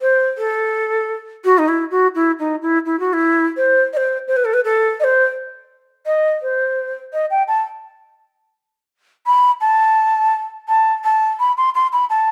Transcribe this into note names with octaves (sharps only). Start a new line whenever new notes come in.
C5
A4
F#4
D#4
E4
F#4
E4
D#4
E4
E4
F#4
E4
C5
D#5
C5
C5
B4
A4
B4
A4
D#5
C5
D#5
C5
D#5
G5
A5
B5
A5
A5
A5
B5
C6
C6
B5
A5